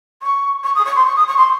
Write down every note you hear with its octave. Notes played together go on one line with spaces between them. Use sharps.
C#6
C#6
D#6
C#6
C6
C#6
D#6
C#6
C6